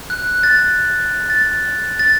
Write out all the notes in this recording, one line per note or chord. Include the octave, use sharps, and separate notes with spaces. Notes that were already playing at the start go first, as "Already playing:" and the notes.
F#6
F#6
A6
A6
A6